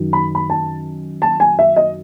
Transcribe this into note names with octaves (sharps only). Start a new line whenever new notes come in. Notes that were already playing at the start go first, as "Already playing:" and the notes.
Already playing: F#2 D#3 F#3
B5
B5
A5
A5
G#5
E5
D#5